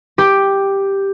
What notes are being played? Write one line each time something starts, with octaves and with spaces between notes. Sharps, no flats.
G4